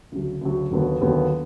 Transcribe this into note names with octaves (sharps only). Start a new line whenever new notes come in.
D2 C#3 F#3
D2 C#3 F#3
D#2 D3 F#3 B3
D#2 D3 F#3 B3